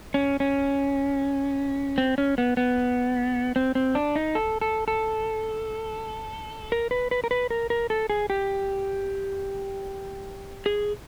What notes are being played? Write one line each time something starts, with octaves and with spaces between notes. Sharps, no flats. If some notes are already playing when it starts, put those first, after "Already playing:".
C#4
C#4
C4
C#4
B3
B3
C4
C4
D4
D#4
A4
A4
A4
A#4
B4
B4
A#4
B4
A#4
A#4
A4
G#4
G4
G#4